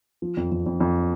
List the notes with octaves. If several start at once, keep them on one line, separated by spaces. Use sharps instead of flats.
F3
F2
F2
F2
F2